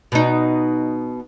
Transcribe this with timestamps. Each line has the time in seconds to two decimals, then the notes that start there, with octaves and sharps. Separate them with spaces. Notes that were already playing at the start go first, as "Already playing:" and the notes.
0.12 B2 D#4